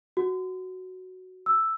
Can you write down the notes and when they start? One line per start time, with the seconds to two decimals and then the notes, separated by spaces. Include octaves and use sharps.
0.17 F#4
1.46 E6